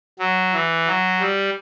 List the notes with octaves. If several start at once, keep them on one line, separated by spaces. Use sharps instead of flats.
F#3
E3
F#3
G3